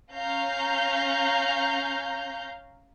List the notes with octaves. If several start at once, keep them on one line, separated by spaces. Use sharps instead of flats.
C#4 F5 A#5 G6